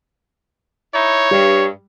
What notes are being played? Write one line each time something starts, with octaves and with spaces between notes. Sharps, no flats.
D#4 E4 C#5
G2 G3